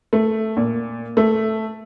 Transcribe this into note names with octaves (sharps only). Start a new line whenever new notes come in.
A3
A#2
A3